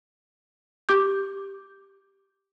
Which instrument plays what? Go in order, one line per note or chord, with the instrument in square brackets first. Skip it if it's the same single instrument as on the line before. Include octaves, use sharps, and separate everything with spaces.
[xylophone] G4 D6 G6